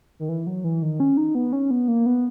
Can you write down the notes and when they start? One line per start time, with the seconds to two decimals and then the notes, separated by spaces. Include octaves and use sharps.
0.19 D#3
0.29 E3
0.47 F#3
0.64 E3
0.82 D#3
1.00 C#4
1.17 D#4
1.35 B3
1.53 C#4
1.71 B3
1.88 A#3
2.06 B3